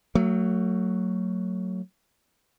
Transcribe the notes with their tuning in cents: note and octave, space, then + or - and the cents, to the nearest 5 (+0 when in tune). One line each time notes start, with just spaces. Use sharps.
F#3 +0 A3 +40